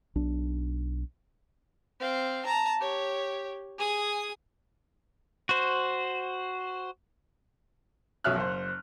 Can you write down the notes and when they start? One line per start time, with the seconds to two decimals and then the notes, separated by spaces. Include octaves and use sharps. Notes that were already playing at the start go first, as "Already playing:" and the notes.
0.15 B1 D4
2.00 C4 F5
2.45 A5 A#5
2.81 G4 C#5
3.78 G#4 D#6
5.49 F#4 C5
8.24 B1 B2 C#4 E5 F6 F#6
8.36 F#1 C5